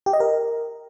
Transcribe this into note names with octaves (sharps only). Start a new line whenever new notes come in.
G4
D#5
A#4